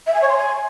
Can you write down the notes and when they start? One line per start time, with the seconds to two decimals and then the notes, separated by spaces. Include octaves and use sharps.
0.07 E5
0.14 G#5
0.22 C#5
0.29 C6
0.37 G#5